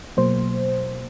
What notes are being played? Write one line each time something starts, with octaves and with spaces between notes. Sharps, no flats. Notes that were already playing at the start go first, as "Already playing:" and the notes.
B2 F#3 A#3 C5